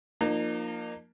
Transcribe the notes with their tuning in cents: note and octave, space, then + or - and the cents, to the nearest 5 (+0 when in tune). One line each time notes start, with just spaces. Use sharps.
F3 +0 A#3 +0 D#4 -45